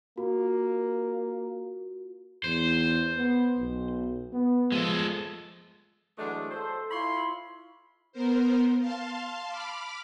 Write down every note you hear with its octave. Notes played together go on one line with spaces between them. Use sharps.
A#3 F4 F#4 A#4
E2 C5
B3
B1
B3
F3 G#3 A4
E3 F#3 G#3 A3 D4
A4 C5
E4 F4 C#5 B5 C6
B3 A#4 C5
F5 A5 C6
B5 D6 F6